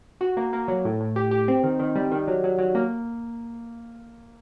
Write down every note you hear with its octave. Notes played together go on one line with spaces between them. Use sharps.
F#4
A#3
A#3
F#3
A2
A2
G4
G4
C4
D#3
D#3
G3
D#3
F#3
F#3
F#3
A#3